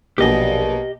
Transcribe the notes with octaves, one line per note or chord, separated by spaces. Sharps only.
A#1 B2 F#3 A#3 G4 D#5